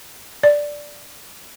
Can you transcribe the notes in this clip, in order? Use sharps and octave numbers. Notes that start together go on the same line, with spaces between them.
D5